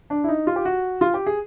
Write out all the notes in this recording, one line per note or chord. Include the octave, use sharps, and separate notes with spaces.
D4
E4
D#4
F4
G4
F#4
F4
G4
G#4